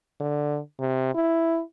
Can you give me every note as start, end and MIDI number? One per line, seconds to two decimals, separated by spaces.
0.20 0.59 50
0.80 1.11 48
1.15 1.61 64